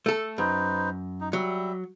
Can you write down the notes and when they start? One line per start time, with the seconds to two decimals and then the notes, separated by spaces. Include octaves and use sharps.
0.06 A3 A4
0.38 F#2 D#4 B4 C5
1.21 D#4
1.33 F#3 G3 E5